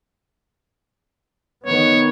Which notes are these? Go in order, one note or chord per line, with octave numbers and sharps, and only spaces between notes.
D#3 B3 C#5